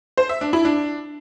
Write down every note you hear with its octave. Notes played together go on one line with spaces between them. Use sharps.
C5
E5
D4
E4
D4